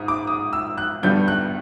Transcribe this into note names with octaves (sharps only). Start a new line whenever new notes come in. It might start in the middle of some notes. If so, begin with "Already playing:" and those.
Already playing: G#2 D#6
D6
D#6
E6
F#6
G2 D3 G3 B3 G6
F#6